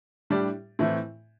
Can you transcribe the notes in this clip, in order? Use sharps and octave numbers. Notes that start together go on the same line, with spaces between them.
A2 G3 D4 G4 D5
A2 E3 A3 C4 E4